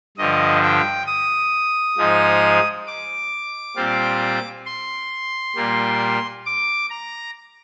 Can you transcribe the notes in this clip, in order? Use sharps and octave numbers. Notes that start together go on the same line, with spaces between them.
G2 D3 F3 D#5
G5
D#6
G#2 F3 G#3 D#4
D6
A#2 G3 C4 F4
C6
A#2 G3 A#3
D6
A#5